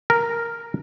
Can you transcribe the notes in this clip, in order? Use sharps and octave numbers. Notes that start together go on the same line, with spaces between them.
A#4